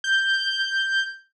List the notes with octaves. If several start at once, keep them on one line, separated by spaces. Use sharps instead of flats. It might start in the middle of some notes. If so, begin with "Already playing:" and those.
G6